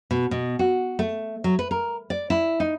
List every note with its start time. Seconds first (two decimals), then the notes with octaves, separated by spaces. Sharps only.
0.11 B2
0.31 B2
0.59 F#4
0.99 A3
1.44 F#3
1.59 B4
1.71 A#4
2.10 D5
2.30 E4
2.60 D#4